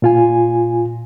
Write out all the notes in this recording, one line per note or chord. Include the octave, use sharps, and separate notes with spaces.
A#2 F4 G#5